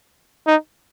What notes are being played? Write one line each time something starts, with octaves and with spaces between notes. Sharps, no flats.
D#4